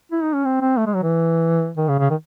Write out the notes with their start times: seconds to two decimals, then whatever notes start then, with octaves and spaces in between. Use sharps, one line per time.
0.12 E4
0.22 D#4
0.34 C#4
0.45 C4
0.61 C4
0.77 A3
0.86 G#3
0.95 F#3
1.03 E3
1.77 D#3
1.88 C#3
1.99 C#3
2.10 D#3